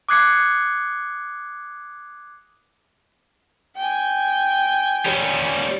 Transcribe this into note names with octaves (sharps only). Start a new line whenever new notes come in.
D6 D#6 F#6 G#6 C7 C#7
G5 G#5
G3 C#4